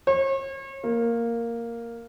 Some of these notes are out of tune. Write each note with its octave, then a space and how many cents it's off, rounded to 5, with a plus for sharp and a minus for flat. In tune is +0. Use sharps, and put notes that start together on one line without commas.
C#5 -40
A#3 -5